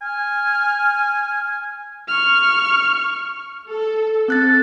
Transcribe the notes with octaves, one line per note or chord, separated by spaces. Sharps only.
G#5 F6
C#6 F6
A4
C4 A4 F#6 A6